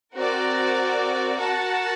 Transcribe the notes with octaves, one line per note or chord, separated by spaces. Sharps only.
C4 F#4 A#4 D5
F#4 A#4 F#5 A5